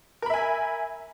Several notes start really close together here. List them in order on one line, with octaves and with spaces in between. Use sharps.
A#4 B5 E5 G#5